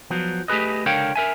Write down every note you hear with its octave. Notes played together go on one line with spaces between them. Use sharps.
F3 F#3 B3
A3 G4 G#4 B4 D#5
C#2 D3 A#4 C#5 F5 G5
A#4 E5 G#5